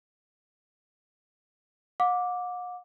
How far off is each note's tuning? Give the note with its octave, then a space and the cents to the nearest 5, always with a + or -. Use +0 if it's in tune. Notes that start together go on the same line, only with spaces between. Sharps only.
F#5 -45 D6 -5